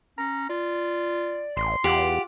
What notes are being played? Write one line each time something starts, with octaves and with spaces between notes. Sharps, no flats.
C#4 A#5
F4 D5
A1 C6
E2 F4 G4 F#5